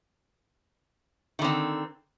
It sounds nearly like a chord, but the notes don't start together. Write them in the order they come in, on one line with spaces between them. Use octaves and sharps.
D#3 D3 C4